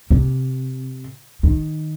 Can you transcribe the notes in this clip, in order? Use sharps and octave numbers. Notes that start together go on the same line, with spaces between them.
C3
D#3